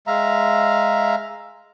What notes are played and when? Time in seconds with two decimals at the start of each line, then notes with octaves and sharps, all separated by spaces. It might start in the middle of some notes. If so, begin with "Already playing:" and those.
0.07 G#3 E5 F5 A#5